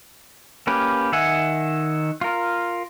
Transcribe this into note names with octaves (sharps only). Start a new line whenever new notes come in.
A#3 C#4 G4 B4
D#3 E5 F#5 G#5
F4 A#4